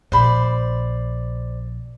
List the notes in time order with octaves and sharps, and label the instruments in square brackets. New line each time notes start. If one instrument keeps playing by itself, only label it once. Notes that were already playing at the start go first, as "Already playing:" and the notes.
[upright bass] A#1 [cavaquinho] C5 D5 B5